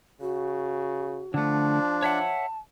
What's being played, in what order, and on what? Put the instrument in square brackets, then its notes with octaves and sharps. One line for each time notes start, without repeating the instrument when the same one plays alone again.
[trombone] C#3 [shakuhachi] F#4
[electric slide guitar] D3 A3 [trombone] F3 [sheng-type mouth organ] D4
[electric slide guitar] C#5 E5 F#5 [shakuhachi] A5